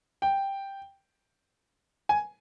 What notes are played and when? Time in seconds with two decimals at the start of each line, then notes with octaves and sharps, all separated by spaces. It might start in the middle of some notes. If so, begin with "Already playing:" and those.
0.22 G5
2.09 G#5